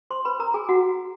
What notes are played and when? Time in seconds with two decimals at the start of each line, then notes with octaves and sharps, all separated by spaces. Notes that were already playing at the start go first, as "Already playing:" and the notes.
0.10 C5 C6
0.25 B4 B5
0.40 A#4 A#5
0.54 G#4 G#5
0.69 F#4 F#5